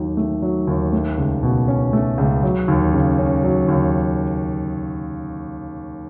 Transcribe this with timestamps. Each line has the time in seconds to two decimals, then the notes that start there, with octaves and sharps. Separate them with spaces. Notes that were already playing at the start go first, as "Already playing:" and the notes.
Already playing: D#2 D#3 F#3
0.17 A3
0.42 F#3
0.67 D#2
0.92 A3
1.18 C#2
1.43 B2
1.68 C#4
1.93 A3
2.18 C#2
2.43 F#3
2.68 D#2
2.93 C#3
3.18 C#4
3.43 F#3
3.68 D#2